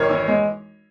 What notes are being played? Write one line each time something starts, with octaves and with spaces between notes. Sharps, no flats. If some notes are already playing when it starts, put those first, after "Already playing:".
Already playing: G#1 A#4 C#5
E3
G#3